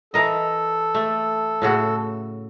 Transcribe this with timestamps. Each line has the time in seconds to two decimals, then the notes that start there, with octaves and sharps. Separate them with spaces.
0.14 E3 A4 A#4 D#5
0.95 A3
1.62 A2 C#3 F#4